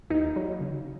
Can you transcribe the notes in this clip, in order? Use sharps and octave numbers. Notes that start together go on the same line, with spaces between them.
D#2 D#4
F#3
C#3